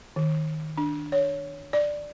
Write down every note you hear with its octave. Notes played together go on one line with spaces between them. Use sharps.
D#3
D4
C#5
D5